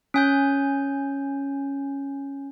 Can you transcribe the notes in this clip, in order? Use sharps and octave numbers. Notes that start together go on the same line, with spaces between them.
C#4 G#5 G6